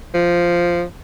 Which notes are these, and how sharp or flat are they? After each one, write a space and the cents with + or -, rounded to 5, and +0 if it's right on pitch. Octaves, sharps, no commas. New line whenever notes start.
F3 -5